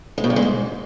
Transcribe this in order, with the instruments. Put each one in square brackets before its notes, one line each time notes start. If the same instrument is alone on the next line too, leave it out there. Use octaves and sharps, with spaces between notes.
[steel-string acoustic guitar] G#3
B2
G2
G#3
G#2